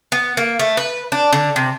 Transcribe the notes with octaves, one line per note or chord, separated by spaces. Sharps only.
B3
A#3
A3
B4
D4
D3
C3